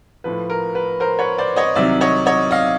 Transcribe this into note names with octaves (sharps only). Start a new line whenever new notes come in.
A2 F3 B4
A#4
B4
A#4 C5
B4 C#5
C5 D5
C#5 D#5
C2 C3 D#3 F#3 D5 E5
C#5 D#5
C#5 D#5
D#5 F5